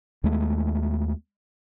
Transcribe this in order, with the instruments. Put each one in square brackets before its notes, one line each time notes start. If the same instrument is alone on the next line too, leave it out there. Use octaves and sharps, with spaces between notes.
[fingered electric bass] D#2 G#3 A3 B3